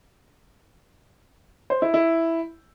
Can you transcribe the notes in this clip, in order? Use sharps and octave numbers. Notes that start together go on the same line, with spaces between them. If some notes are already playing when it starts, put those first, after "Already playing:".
C5
E4
E4